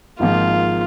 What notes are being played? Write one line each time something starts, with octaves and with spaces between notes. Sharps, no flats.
G#1 G#2 F3 A#3 F4